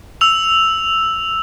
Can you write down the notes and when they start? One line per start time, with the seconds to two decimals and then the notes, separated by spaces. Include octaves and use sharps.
0.21 E6 F7